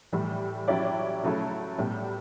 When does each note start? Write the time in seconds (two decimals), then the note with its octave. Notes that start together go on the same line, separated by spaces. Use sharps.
0.12 A2 E3 G3
0.68 F#3 C#4 E4 G4 D5
1.23 C#3 F#3 A3 E4 A4
1.79 A2 G3 B3